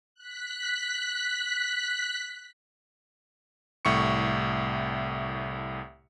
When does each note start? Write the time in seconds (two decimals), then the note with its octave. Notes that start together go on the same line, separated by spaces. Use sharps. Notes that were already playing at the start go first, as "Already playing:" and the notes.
0.15 F#6 B6
3.85 C2 A2 C#6 C#7